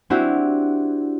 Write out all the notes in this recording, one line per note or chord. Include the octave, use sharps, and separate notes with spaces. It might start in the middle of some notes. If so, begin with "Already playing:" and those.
C4 D4 E4 F#4 G4